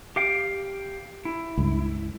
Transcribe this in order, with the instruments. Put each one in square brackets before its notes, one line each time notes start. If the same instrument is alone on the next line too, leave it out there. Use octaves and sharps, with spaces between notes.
[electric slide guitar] G4 F5 G5
E4
[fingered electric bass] C#2 G2